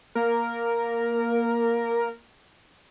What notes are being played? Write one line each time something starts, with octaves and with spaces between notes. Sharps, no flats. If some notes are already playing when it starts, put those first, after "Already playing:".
A#3 A#4